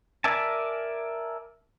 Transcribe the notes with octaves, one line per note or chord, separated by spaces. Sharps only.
A#4 D5 E5 G#5 A5